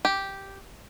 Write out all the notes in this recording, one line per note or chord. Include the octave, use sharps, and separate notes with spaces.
G4